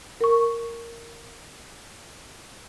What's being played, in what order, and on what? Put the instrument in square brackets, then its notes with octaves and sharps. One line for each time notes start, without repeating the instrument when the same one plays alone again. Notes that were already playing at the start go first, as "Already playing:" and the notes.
[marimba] A#4 C#6